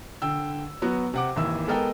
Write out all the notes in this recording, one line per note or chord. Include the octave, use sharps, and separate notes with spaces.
D3 G5 E6
F#3 B3 F#4
C3 F#5 D6
G#1 D#2 E3 E6
G#3 B3 A4 A#4 D#5 G5